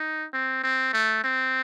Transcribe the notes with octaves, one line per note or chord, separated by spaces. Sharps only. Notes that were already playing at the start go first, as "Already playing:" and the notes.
Already playing: D#4
C4
C4
A3
C4